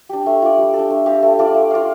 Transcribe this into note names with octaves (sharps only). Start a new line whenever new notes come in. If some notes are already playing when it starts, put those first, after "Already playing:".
D4 G4
A3
F4 D5
G3
A4
D4
A3
C4 G4 F5
A3
F4 A4 D5
A3
F4 D5 F5